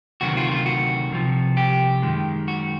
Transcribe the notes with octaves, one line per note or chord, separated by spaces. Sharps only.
D2 C3 D#3 F#3 F#4
F4
F4
F#4
C2 C3 F3
G4
F#2 D#3 G#3
F#4